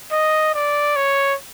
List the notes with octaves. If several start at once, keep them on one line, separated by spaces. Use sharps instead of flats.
D#5
D5
C#5